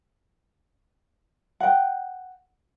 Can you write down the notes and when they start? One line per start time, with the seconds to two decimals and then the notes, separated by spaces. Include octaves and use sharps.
1.60 F#5 G5